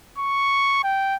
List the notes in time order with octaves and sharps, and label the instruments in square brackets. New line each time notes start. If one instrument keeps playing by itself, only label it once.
[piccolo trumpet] C#6
G5